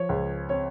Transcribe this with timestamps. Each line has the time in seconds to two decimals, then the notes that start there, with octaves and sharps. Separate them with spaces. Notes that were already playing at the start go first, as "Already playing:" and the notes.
Already playing: F3 C#5
0.09 C#2
0.49 C4 C#5